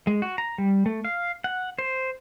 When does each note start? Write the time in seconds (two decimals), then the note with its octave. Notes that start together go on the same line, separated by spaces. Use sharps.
0.07 G#3
0.22 F#4
0.38 A#5
0.58 G3
0.86 A3
1.05 F5
1.44 F#5
1.79 C5